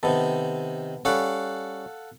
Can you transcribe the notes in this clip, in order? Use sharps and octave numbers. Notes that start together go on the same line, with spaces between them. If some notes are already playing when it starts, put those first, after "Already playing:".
C3 D#3 B3 A4
G3 C#4 A4 F5 F#5